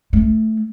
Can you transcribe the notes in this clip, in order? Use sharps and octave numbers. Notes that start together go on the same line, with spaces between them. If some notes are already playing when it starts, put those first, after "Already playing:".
A3